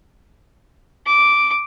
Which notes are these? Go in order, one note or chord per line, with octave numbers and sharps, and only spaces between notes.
D6